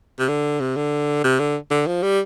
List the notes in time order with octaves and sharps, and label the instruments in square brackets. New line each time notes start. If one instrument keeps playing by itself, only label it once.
[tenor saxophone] C3
D3
C3
D3
C3
D3
D3
F3
G3